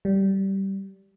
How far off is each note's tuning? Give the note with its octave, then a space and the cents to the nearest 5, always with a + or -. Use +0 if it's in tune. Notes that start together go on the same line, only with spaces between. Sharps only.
G3 -15